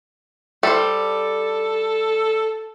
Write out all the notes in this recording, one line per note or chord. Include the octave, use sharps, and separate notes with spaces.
G3 A4 C5